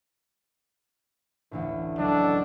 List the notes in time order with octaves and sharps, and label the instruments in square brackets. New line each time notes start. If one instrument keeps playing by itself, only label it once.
[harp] A1 D2 A2
[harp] C#2 F#3 D#5 [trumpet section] D4 A4